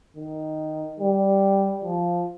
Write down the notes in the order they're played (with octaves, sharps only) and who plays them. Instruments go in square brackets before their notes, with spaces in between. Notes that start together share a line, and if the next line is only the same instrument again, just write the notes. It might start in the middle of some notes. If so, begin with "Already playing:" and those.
[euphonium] D#3
G3
F3